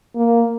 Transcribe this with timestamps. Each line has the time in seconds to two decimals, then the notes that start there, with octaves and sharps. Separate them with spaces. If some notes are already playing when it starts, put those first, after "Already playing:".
0.16 A#3